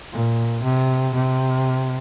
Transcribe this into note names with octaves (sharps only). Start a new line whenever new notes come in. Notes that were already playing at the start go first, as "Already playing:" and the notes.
A#2
C3
C3